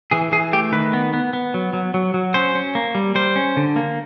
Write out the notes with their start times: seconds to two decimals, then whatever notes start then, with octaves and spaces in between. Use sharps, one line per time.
0.11 E3 G#4
0.32 E3 G#4
0.53 A3 G4
0.72 D#3 B4
0.93 B3
1.13 B3
1.33 B3
1.54 F#3
1.73 F#3
1.94 F#3
2.14 F#3
2.34 C#4 C5
2.55 C#4
2.75 A#3
2.95 G3
3.15 G3 C5
3.36 C#4
3.57 D3
3.76 A#3